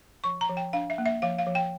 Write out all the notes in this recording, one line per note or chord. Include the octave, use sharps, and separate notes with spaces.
F3 C#6
A#5
F3
G5
D4 F5
E5
A#3
E5
F3 F5
F5
F3
G5